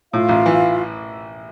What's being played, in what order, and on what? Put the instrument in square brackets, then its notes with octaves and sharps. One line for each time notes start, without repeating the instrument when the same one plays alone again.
[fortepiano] A2 [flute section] F4 F5
[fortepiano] A1
E3